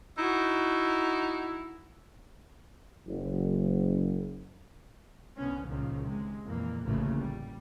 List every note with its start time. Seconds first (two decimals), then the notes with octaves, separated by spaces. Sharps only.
0.17 D#4 E4 F#4
3.07 F#1
5.37 C2 D3 B3 C#4
5.68 C#2 A#2 D#3 F3
6.02 C3 G#3
6.46 F2 A#2 E3 A#3
6.85 A1 D2 A2 C#3 A3 A#3
7.19 G3